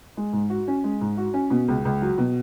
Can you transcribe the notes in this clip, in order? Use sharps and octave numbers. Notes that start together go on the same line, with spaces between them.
G#3
G#2
F#4
C#4
G#3
G#2
F#4
C#4
B2
C#2
C#2
F#3
B2